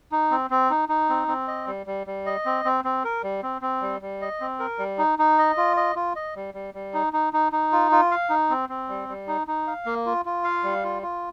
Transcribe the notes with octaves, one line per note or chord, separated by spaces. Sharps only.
D#4
C4
C4
D#4
D#4
C4
C4
D#5
G3
G3
G3
D#5
C4
C4
C4
A#4
G3
C4
C4
G3
G3
D#5
C4
A#4
G3
D#4
D#4
D#5
F4
D#5
F4
D#5
G3
G3
G3
D#4
D#4
D#4
D#4
F4
F4
F5
D#4
C4
C4
G3
G3
D#4
D#4
F5
A#3
F4
F4
F5
G3
F4
F4